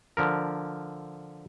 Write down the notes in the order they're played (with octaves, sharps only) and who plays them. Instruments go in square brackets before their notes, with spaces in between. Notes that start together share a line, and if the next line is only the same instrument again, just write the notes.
[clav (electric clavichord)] D3 F3 A#4